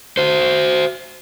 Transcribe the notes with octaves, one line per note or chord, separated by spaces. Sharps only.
F#4 C5